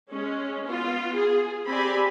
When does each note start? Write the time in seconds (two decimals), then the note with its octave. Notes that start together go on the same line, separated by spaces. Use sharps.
0.11 G#3 C#4
0.66 B3 F4
1.15 G#4
1.67 C4 G4 D5 G#5 B5